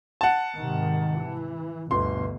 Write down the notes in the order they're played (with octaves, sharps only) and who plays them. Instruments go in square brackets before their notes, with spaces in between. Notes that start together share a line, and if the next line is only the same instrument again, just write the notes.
[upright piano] F#5 A5
[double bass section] G#2 C3 D#3
E3
[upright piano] G1 C6 [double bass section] D2 B2